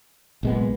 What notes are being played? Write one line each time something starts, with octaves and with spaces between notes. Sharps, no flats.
B1 A#2 G#3 B3